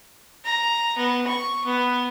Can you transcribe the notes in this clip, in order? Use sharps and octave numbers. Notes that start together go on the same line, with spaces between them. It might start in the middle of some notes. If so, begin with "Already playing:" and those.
A#5
B3
C#6
B3